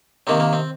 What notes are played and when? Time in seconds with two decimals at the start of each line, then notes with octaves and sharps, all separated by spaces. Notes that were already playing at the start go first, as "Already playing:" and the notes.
0.27 C3 D#3 A#3 C4
0.40 A#3
0.53 C4